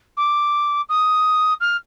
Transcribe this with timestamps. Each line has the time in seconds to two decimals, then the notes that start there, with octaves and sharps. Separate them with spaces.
0.17 D6
0.89 D#6
1.60 F6